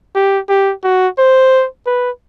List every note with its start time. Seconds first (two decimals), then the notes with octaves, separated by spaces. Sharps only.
0.15 G4
0.49 G4
0.83 F#4
1.18 C5
1.86 B4